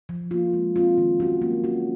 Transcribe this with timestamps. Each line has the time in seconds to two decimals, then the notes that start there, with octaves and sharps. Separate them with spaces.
0.09 F3
0.31 A#3 F4
0.53 G#3
0.76 C4 F4
0.98 D#3
1.20 F#3 C#4 F#4
1.42 A#3
1.64 C#4 F#4